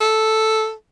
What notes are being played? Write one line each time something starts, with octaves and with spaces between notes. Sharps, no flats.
A4